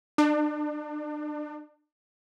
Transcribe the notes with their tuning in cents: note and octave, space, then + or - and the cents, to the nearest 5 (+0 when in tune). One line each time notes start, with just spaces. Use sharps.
D4 +35